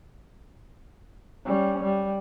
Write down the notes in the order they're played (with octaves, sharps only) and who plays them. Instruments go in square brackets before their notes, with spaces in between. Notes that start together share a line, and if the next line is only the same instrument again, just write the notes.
[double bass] G3 C#4
G3